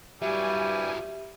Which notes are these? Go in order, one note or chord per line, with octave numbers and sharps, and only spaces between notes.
G2 F#3 G3 E4 G4 E5 G#5